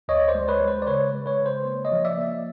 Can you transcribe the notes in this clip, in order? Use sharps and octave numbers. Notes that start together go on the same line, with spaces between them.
D2 C#5 D#5
C5 D5
G#3
B4 C#5
G#3
C5
D5
C#3 B4 C#5
G#3
B4 C#5
C#3
C5
A#3
C#5 D#5
F3
D5 E5
A#3